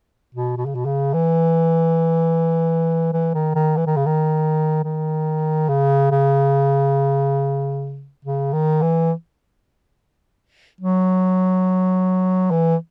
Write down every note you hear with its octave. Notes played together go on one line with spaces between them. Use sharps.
B2
B2
C#3
B2
C#3
E3
E3
D#3
D#3
E3
D#3
C#3
D#3
D#3
C#3
C#3
C#3
D#3
E3
F#3
E3